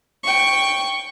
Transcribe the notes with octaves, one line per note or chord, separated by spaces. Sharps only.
G5 C#6